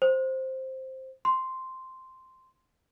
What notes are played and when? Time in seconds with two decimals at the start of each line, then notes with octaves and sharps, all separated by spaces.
0.02 C5
1.25 C6